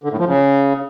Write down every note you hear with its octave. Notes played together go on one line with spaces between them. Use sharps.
D3
A2
F3
C#3